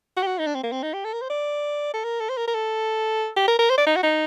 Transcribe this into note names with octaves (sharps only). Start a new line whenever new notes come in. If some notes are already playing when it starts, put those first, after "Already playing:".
F#4
G4
F#4
D#4
D4
C4
A#3
C4
D#4
G4
A4
A#4
C5
D5
A4
A#4
A4
C5
A#4
A#4
A4
G4
A#4
A#4
C5
D5
D#4
F#4
D#4